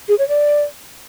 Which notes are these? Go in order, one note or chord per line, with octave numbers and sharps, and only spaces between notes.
G#4
C#5
D5